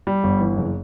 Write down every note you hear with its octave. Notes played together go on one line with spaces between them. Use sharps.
G3
G1
E3
F#1